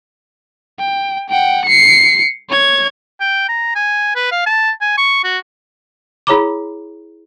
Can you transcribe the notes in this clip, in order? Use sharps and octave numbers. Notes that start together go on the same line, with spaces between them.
G5
F#5 G5
C7 C#7
C#5 G#6
G5
A#5
G#5
B4
F5
A5
G#5
C#6
F#4
E4 G#4 C#5 A#5 B5 D6